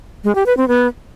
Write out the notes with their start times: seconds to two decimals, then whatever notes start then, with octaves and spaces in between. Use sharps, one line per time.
0.24 G#3
0.35 G4
0.46 B4
0.57 C4
0.68 B3